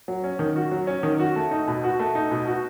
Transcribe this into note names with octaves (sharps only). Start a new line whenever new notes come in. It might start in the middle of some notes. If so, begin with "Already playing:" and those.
F#3
C#4
D#3
F#4
F#3
C#4
D#3
F#4
A3
D#4
B2
F#4
A3
D#4
B2
F#4